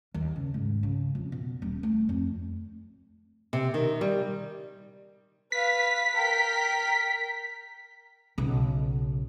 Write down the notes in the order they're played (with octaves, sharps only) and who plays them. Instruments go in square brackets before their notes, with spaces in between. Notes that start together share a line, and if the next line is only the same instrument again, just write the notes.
[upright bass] D#2
C#3
G#2
C#3
F2
B2
D#1
A3
F2
[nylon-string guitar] C3
D#3
G3
[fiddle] B4 F5 [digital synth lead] B6
[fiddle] A#4 G5
[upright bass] B1 C#3